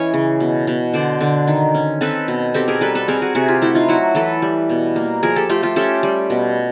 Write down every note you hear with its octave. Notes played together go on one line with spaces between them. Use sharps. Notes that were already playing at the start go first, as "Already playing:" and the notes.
Already playing: E3 C#4 C#5 D#5
C#3
B2
B2
D3 C5 D5
D3
D#3
C#4
C4 A4 B4
B2
C4 G4 A4
G#4 A#4
G3 A4 B4
A4 B4
C4 G#4 A#4
F#4 G#4
C3 F#4 G#4
F4 G4
A3 E4 F#4
D#4 F4
F#3 E4 F#4
E3 A4 B4
G3
B2
A#3
F3 G#4 A#4
G4 A4
A3 F4 G4
F4 G4
C#4 G4 A4
G3
B2